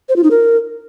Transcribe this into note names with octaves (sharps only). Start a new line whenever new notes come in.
C5
F4
D#4
A#4